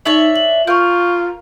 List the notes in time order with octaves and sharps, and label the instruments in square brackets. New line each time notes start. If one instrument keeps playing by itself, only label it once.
[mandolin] D4 C#5 E5 [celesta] D#4 F#7
[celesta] F#7
[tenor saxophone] F4 [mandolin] A#4 [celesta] C#6 G6